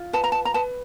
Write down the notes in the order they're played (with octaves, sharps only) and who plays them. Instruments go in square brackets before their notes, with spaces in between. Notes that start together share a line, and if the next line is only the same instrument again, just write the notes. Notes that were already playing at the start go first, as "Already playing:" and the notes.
Already playing: [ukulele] F4
B4 A5
A#5
A5
A#5
B4 A5